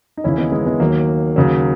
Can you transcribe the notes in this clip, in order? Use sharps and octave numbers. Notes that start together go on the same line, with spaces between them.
D#4
D#2 C#3 E3 C#4 E4
B3 D#4
G#3 B3
G#3 B3
D#2 D#3 F#3 A#3
D#2 C#3 F#3